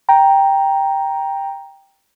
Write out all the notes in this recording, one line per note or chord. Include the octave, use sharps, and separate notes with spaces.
G5 A#5